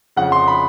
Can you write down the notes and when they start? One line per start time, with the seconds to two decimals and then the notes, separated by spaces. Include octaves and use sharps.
0.16 F2 C#3 F3 F#5
0.32 C6
0.48 B5